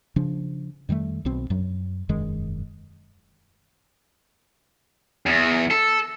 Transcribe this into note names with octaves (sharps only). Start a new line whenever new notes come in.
C#3 F3 D4
F2 D#3 G3 A3
B1 B2 C4
F#2 F#3
E1 F#2 D#3 G#3
E2
A4